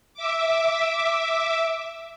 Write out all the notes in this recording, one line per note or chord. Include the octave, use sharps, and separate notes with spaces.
E5 D6